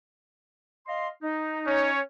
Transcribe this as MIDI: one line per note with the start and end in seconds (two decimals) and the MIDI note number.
0.87 1.08 75
0.87 1.08 77
0.87 1.08 84
1.22 1.91 63
1.65 2.00 61
1.65 2.00 73